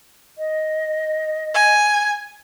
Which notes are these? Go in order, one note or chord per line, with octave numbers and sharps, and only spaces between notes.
D#5
G#5